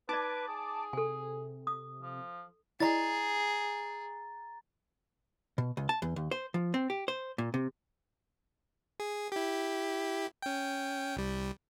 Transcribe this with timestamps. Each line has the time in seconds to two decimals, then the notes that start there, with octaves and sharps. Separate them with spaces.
0.09 D#4 B4 D5 A5 D6
0.48 G#4
0.93 C3 A4 G#5
1.67 D#6
2.02 F3
2.80 E4 G#4 D5 D#5 A#5 A6
5.58 B2
5.77 C#2
5.89 A5
6.02 E2
6.16 D#2
6.31 C5
6.54 F3
6.74 C4
6.90 G4
7.08 C5
7.38 A#2
7.54 C3
9.00 G#4
9.32 E4 G4
10.42 C#4 G5
11.17 C2 G3